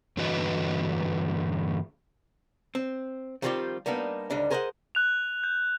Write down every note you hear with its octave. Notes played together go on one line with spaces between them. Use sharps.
G2 D3 E3 F#4 B4 D#5
C4
D#3 F3 G3 C4 F4 G4
G3 A#3 B3 D4 D#4
C#2 G#2 D3 G3 D4
G#4 A#4 C5 D#5 F5 F#5
F#6 F7
G6